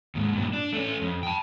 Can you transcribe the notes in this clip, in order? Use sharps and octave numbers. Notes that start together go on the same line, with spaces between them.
D#2 G#2
G2 A#2
D4
A3 C#4
F2
G5 A5